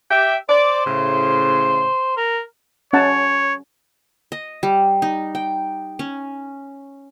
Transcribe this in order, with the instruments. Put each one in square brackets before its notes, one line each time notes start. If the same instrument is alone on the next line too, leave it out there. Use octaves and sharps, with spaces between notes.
[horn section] G4 G5 [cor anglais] E5
[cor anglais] C5 [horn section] D5
[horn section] A2 C#3
[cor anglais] A#4
[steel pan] C#4 F#5 A5 [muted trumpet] C#5
[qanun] D#5
G3
D#4
G5
C#4